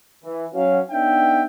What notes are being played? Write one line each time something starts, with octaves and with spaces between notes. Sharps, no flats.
E3
F#3 C#4 F5
B3 D4 D#4 E5 G5